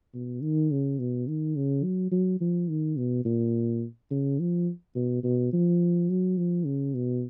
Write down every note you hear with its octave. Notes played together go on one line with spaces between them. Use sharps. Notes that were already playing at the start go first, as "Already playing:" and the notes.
B2
D#3
C#3
B2
D#3
C#3
F#3
F#3
F3
D#3
B2
A#2
C#3
F3
B2
B2
F3
F#3
F3
C#3
B2